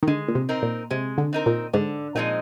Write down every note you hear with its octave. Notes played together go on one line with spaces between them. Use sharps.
D#3
D3 G#3
A#2
C3
C4 D#4 A#4
A#2
C3 G#3
D3
C4 D#4 A#4
A#2
G#2 D3
A#2 F3 G#3 C4 D#4